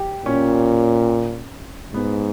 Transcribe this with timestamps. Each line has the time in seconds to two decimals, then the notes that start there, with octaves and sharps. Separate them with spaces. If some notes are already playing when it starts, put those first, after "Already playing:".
Already playing: G4
0.25 A#2 C#4
1.93 G#2 B3